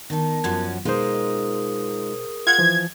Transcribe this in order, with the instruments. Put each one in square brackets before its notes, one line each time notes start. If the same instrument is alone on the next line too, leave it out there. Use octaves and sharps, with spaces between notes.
[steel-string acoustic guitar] D#3 D#4 [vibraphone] B3 A#4 A5
[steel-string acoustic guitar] F#2 F3 F#3 [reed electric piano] G#6
[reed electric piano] B2 C5 [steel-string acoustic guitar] G#3 D#4 F4 [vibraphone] G#4 A#4 D#6
[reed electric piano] F4 F5 F#5 [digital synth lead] G#6
[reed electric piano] E3 F3